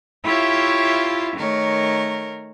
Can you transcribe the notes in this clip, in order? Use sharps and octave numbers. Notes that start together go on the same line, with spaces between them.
E4 F4 G4 C#5 E5 F5
D#3 A3 A#4 C#5